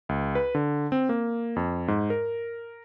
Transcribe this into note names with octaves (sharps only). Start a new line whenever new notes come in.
C#2
B4
D3
C4
A#3
F2
G#2
A#4